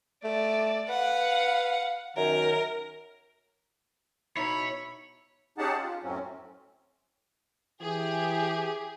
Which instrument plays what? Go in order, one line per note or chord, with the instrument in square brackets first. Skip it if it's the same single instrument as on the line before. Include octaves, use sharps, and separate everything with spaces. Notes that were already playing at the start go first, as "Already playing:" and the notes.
[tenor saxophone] A3 [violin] D5
[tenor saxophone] B4 [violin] F5 F#5
[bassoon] F#2 [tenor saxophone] D#3 [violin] A#4
[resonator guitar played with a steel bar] B2 D#4 E4 [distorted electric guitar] C#5 [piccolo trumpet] B5
[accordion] C#4 D#4 G4 G#4 F#5 A5
F4
F#2 A2 F#3 C4 C#4
[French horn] E3 [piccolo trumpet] G4 [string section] G#4